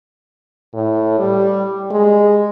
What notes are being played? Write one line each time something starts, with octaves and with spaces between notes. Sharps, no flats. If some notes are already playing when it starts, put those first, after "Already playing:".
A2
G3
G#3